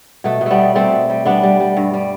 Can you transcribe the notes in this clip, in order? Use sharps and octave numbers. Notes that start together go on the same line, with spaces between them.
B2 A3
B2
G3 A3 B3
B2
G3 A3 C4
B2
G3
G3 B3 D4
G3
G3
G2
G3